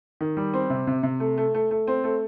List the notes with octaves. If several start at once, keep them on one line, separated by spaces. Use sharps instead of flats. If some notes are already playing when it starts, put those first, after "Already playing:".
D#3
G3
C4
C3
C3
C3
A3
A3
A3
A3
C4
A3